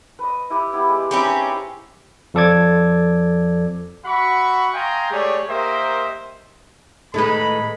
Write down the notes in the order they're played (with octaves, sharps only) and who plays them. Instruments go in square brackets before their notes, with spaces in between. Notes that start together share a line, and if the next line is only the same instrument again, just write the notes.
[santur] B4 D#5
E4 G4 B4
B3 E4 G4
G#3 G4
[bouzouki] C4 C#4 G4 [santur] D#4 E4 D#5
[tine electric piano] F2 F3 A4 D5 D6 G#6
[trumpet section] F#4 E5 F#5 B5 C#6
D#5 F5 G5 G#5 A#5 C6
G#3 A3 G4 G#4 C#5 D5
A#3 G4 A#4 C5 D#5 E5
[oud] A2 B4 [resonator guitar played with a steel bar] D#3 G#3 D#4 [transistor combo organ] A3 A4 [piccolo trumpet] B5